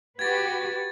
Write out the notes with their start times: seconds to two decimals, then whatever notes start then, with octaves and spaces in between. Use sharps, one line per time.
0.19 F#4 G4 B4 G#6 A6